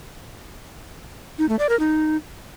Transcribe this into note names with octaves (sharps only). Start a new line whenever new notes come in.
D#4
A3
D5
A#4
D#4